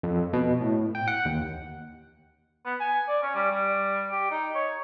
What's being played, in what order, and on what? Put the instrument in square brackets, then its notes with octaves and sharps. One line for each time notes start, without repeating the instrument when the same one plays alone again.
[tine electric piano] F2
B2
A2
G5
F#5
D#2
[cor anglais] B3
G#5
D5
C#4
G3
G3
G4
D#4
C#5